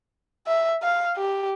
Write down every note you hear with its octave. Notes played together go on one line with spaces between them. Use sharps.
E5
F5
G4